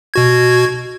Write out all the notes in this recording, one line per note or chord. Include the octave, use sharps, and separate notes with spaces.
B2 F#4 G#6